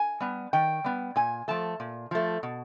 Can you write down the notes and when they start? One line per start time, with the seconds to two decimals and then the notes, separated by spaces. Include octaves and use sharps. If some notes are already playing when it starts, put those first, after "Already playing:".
Already playing: G#5
0.20 G3 B3
0.53 D#3 G5
0.84 G3 B3
1.16 A#2 G#5
1.48 F3 A3 A5
1.80 A#2
2.11 F3 A3
2.43 B2